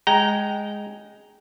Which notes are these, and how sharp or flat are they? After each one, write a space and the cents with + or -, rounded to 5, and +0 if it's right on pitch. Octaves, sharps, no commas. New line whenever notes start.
G#3 +0 G5 -20 A#5 +0